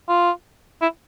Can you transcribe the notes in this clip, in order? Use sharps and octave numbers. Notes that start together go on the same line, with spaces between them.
F4
E4